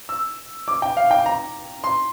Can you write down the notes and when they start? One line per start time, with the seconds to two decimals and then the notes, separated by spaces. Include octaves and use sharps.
0.09 E6
0.68 D6
0.82 G5
0.97 F5
1.11 G5
1.26 A#5
1.84 C6